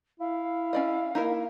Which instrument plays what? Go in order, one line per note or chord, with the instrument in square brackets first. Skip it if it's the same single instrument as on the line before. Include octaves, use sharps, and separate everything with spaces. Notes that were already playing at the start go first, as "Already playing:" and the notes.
[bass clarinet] E4 [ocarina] F5
[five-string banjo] C#4 D5 D#5
[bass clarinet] A#3 [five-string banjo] D#4 E4 A#4